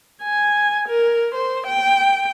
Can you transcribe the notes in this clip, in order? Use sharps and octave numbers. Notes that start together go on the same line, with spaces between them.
G#5
A#4
C5
G5